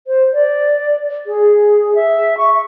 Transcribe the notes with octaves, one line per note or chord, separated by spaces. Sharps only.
C5
D5
G#4
E5
C#6